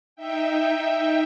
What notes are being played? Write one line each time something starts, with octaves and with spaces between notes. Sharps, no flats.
D#4 E5 G5